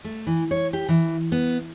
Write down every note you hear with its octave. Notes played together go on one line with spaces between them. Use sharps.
A3
E3
C#5
G4
E3
B3